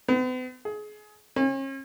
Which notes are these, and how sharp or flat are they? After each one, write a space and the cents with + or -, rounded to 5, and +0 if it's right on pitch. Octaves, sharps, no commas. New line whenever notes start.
B3 +45
G#4 +25
C#4 -40